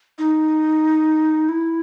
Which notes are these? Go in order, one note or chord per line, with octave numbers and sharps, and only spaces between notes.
D#4
E4